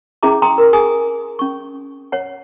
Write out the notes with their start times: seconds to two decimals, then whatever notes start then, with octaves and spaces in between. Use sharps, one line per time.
0.23 C#4 E4 G#4 E5 A#5 D6
0.42 G5 A#5 C6 D#6
0.58 A#4
0.73 G#4 G#5 D#6
1.39 C#4 C#6
2.12 C#5 F#5